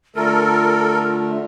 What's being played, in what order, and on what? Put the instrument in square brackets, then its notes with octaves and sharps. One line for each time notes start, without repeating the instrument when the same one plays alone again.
[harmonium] D3 A3 [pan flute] F4 [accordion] A4 A#4